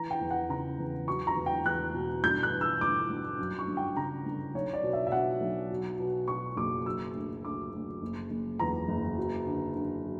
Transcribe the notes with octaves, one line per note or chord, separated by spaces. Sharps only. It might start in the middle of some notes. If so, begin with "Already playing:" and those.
Already playing: E3 A#5
G5
E2
F#5
C#3 A#5
E2
F#3 C#6
A#5
E2
G5
E2 F#6
B2
G1 G6
F#6
E3
E6
G1 D6
G1
F#2
C#6
G1
G5
C#3 A#5
G1
B1 C#5
D5
B2
E5
E5
B2 F#5
B1
F#3
B2
B2 C#6
F#1 D6
F#3 E6
D2
D2 D6
D2
F#1
F#1
E2 A#5
F#1
F#3
D3
D3
F#3